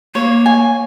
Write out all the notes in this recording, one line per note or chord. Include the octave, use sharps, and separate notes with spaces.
A#3 C#5
G#5